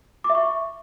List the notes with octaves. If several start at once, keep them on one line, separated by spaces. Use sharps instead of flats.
D6
E5
C#6